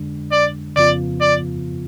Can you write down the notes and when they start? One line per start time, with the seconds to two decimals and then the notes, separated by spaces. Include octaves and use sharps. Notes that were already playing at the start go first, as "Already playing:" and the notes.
Already playing: F2 D3 G#3 D4
0.32 D5
0.76 F2 C#3 F3 B3 F4 D5
1.21 D5